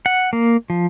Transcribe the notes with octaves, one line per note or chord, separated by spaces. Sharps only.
F#5
A#3
F3